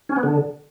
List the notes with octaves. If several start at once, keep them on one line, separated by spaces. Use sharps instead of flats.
C#4
B3
D3